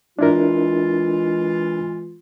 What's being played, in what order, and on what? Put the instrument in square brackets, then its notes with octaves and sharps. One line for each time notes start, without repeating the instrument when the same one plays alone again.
[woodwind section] E3 G#3 F4 [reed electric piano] D4 E4 A#4